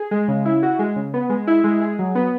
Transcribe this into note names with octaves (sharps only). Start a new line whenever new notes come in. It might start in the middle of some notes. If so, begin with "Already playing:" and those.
Already playing: G#4
G#3
C#3
E4
F#4
G#3
C#3
B3
G#3
E4
G#3
G#4
F#3
B3